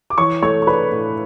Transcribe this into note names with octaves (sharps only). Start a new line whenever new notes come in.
D6
E3 C#5 C#6
A3 C#5 C#6
C#6
D4 B4 B5
A2